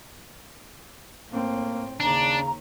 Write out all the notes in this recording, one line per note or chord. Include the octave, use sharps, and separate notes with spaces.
A2 A#3 C4
D#2 C#3 D4 A#5